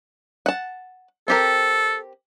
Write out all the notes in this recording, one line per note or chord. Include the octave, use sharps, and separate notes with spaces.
F#5 A5
C4 G4 A4 A#4